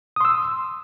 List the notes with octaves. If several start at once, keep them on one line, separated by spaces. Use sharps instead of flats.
C6 D#6 E6